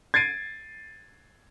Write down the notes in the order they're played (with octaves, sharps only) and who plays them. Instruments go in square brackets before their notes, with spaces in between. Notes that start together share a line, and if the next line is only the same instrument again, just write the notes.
[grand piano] G#6 A6 C7 D7 D#7